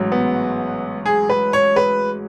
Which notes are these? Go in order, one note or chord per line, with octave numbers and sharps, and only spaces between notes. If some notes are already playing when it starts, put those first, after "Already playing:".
Already playing: A1 G#2 F#3
B3
G#4
B4
C#5
B4